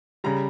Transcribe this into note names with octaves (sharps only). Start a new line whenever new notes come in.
C#3 G3 A#5